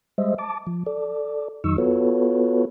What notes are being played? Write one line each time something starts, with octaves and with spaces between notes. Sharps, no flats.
G3 G#3 C5 D#5 E5
A5 D6
F3
A4 D5
F2 D#3 F#3 D#4 C#6 E6
B3 F4 F#4 A4 B4 C#5